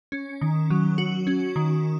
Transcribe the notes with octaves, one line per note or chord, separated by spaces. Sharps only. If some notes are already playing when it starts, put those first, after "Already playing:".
C#4
D#3
F#3
F#4
C#4
D#3